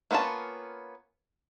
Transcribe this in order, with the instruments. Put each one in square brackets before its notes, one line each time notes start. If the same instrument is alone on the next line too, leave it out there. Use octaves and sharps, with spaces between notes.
[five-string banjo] A#3 B3 C#4 F4 A5